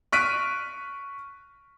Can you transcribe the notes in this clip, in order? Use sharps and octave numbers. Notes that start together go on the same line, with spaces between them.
C#6 F6 F#6 B6 D7 D#7